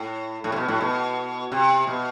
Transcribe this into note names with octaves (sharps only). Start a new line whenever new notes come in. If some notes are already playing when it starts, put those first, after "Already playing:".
Already playing: A2
A2
C3
B2
A2
B2
C3
B2